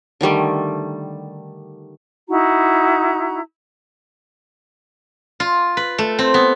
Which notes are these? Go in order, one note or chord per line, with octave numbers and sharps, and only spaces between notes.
D3 D#3 G3 A3
D#4 E4 F#4 A#5
F4
B4
A3
C4
B3